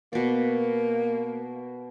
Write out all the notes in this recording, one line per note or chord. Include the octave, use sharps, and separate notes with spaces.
B2 A#3 D5